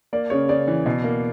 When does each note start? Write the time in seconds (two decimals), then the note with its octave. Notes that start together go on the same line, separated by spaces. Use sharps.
0.13 A#3 D5
0.30 C#3 C#5
0.49 C#3 D5
0.68 E3
0.86 B2
1.04 A#3